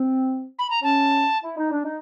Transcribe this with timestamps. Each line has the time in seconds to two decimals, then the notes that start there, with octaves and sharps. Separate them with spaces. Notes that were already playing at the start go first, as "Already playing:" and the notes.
Already playing: C4
0.59 B5
0.70 A#5
0.82 C#4 A5
1.44 E4
1.57 D#4
1.72 D4
1.85 D#4